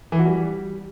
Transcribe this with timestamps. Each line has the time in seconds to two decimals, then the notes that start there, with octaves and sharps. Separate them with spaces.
0.12 E3
0.19 F#4
0.26 G3